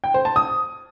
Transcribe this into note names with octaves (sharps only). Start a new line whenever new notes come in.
G5
C5
A5
D#6